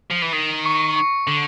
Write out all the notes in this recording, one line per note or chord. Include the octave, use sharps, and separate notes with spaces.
F3
E3
D#3 C7
C#6 C#7
C#6 C#7
D3